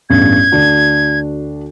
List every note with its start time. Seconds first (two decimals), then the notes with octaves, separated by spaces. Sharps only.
0.10 A1 E2 G2 G#6
0.52 D2 D4 F#4